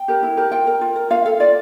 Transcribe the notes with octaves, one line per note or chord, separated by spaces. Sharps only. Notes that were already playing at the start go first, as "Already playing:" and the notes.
Already playing: G5
G4 A#4
E4
G4 A#4
F4 G5
A#4
F4
A#4
F4 F5
A4 F5
F4 D5